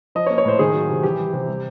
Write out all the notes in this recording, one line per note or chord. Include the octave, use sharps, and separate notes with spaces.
F3 D#5
C#5
A#3
C#5
A2 C5
D#3 G#4
F#3
C3
E3 G4
G3
C3
G3